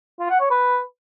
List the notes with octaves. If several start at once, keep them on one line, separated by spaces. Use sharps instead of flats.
F4
F#5
C#5
B4